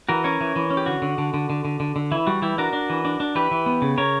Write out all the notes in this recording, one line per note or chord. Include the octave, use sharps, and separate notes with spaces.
E3 F#4 A#4
C#4 A#4 C#5
E3
E3
C#4
G4
D3 F#4
D3
D3
D3
D3
D3
D3
D3
E3 E4
G3 F#4
E3 E4 G4
D4 F#4 A#4
D4
E3
D4
D4
E3 G4 B4
E3
B3
C#3
C#3 A#4 C#5